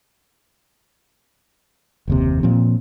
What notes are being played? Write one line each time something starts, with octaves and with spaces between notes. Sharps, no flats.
F#1 D#2 C3
A#2 F3 C4